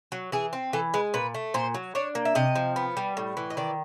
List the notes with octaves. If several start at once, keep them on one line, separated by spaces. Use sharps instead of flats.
F#3
E3 G#4
C4
E3 A4
G#3 B4
A#2 B4
A3
A#2 C5
F#3
D4 C#5
A#3
E5
C3 D#5
F3
B3
G3
A2
E3
D#5
D#3 D5